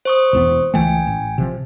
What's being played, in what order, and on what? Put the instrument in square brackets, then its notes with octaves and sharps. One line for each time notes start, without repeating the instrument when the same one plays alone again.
[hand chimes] C5 C#6 D#6
[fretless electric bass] E1 E2 B3
[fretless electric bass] C#2 E3 A3 [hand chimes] G5 G#5
[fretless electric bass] A1
C3 F3